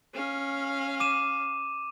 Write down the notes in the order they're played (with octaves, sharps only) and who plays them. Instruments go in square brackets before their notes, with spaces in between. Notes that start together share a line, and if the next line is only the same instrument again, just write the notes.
[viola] C#4 F5
[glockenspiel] D6 D#7 E7